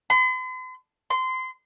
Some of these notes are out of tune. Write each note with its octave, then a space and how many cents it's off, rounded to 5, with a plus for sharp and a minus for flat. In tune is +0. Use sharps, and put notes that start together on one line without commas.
C6 -45
C6 -20